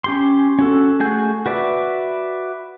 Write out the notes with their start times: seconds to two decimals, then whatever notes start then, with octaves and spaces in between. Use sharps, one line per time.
0.04 C#4 G4 C6
0.59 C#4 F#4 A4
1.00 A3 F#4 G#4 G#5 G6
1.46 F#4 B4 D5 E5